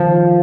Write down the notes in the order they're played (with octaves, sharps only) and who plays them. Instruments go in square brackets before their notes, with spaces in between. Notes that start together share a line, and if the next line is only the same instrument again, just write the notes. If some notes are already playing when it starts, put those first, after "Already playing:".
Already playing: [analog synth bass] D#3 [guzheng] F3